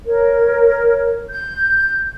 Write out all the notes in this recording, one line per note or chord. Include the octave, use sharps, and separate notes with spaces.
A#4 C#5
G6